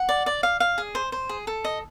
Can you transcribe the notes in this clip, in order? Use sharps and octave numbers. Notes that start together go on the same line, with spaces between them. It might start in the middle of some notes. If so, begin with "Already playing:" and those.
Already playing: F#5
D5
D5
F5
F5
G#4
C5
C5
G#4
A4
D#5